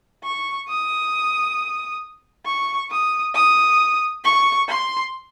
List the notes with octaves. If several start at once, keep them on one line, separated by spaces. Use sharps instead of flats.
C#6
D#6
C#6
D#6
D#6
C#6
C6